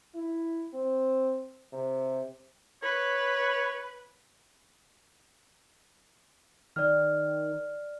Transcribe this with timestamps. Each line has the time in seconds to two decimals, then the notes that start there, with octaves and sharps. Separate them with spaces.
0.15 E4
0.74 C4
1.73 C3
2.83 B4 C#5
6.76 D#3 D5 F6